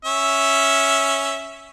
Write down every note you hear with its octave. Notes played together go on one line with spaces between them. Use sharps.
C#4 E5